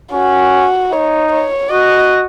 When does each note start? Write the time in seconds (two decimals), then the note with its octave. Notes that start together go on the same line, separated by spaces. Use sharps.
0.12 C#4 F#4
0.92 D#4 C#5
1.32 C#5
1.71 F#4 D#5